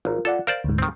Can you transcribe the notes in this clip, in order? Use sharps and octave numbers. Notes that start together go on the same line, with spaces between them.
G#1 F4 A#4
F4 A4 D5 F#5
A#4 C5 D5 F5
D2 G#2
D#3 C4